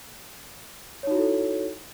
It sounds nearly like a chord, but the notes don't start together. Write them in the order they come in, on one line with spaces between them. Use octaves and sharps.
C#5 D#4 F#4 E4 A4